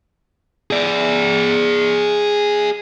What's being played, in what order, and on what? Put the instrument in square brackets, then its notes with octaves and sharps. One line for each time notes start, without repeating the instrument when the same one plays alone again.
[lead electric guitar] G#4 D5